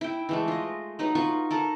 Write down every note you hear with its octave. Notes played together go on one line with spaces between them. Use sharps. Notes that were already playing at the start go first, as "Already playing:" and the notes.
E4 G5
E3 G#3 A3
F4 D#5
F#3 D#4 B4 D#5
F4 F#4 B4 C#6
A4 A#4 F#5